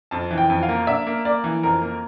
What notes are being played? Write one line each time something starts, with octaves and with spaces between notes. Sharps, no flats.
F2 A5
E3
G5
F2
F5
A#3
D4 E5
A#3
A#3 D5
E3
F2 A#4
A#3